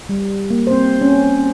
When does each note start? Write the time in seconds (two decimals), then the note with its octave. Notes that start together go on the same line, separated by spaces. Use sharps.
0.09 G3
0.50 A#3
0.67 C4 C5
1.01 C#4